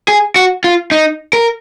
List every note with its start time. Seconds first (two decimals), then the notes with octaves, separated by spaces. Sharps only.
0.08 G#4
0.36 F#4
0.64 F4
0.91 D#4
1.33 A#4